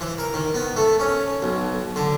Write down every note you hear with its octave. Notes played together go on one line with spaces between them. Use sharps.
E3
A#4
D#3
B3
A3
C#4
B1
D3